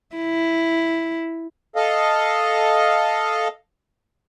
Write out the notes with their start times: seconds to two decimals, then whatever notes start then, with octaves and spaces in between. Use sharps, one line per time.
0.16 E4
1.76 A4 D#5 F5